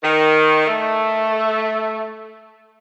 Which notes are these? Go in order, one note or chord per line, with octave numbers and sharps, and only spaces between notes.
D#3
A3